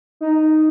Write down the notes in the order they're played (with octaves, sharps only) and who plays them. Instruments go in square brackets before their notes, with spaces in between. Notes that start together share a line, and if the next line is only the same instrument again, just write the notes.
[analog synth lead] D#4